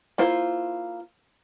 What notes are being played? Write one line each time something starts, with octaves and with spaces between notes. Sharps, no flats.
A#3 E4 F4 C5